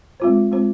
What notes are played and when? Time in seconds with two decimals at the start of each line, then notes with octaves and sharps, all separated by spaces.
0.20 G#3 C4 F4 C5
0.51 G#3 C4 F4 C5